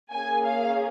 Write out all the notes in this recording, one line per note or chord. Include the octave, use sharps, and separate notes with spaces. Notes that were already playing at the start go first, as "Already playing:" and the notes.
A#3 C#4 G#4 G#5
F5